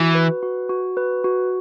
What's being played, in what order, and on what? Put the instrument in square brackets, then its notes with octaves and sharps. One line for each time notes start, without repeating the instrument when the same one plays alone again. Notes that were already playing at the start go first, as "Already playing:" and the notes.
Already playing: [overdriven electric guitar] E3 [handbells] F#4
[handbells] B4
F#4
F#4
B4
F#4